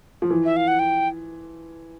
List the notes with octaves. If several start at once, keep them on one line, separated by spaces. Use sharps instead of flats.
F3
E3
E5
F5
F#5
G5